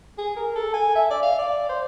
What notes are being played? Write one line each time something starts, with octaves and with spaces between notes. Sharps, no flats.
G#4
A#4
A4
G#5
E5
D5
F5
D5
C5